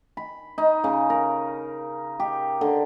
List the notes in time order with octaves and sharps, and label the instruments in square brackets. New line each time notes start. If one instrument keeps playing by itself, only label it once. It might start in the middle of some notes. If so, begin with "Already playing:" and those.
[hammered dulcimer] B5
D#4
C#3
A#4
G4
D3